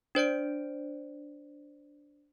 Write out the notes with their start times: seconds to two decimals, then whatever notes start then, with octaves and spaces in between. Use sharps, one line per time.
0.15 D4 C5 D5 D7